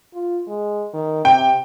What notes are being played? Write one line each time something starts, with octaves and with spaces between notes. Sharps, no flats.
F4
G#3
D#3
C3 G5